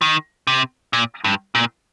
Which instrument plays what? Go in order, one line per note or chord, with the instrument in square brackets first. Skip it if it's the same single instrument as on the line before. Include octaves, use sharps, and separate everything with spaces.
[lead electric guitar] D#3
C3
A#2
G2
A#2